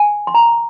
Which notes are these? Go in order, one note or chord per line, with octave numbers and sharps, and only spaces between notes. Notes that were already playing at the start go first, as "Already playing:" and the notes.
Already playing: G#5
C6
A#5